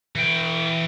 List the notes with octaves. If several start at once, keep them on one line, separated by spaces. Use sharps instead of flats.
E3 G5